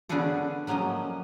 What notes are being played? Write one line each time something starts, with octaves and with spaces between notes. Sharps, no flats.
D3 B3 C#4 D4 G#4 A4
F3 F#3 A#3 C#4 D#5